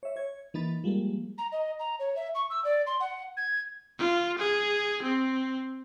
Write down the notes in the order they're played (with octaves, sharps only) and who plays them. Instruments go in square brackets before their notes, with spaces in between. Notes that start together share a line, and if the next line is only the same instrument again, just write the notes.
[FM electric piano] C#5 E5
C#5 G#6
E3 A#3 D#4 B5 A6
F3 G3 G#3 A#3
[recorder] A#5
D#5
A#5
C#5
E5
C#6
E6
D5
C6
F#5
G#6
[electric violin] F4
G#4
C4